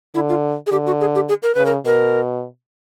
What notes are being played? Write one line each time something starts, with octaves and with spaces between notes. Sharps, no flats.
D3 E4
F4
G#4
D3 G4
F#4
G#4
G4
G#4
A#4
C#3 B4
A#4
B2 A#4